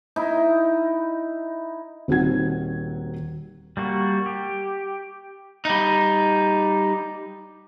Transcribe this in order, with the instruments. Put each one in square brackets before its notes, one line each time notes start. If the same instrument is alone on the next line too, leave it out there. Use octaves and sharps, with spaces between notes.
[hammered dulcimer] D#4 E4
[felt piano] D#1 C4 D#4 F#4 F#5 G#6
[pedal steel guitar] G3 A#3 F#4
G4
[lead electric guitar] G3 D#4